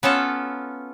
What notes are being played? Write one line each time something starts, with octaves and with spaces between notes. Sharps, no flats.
B3 C#4 F4 A4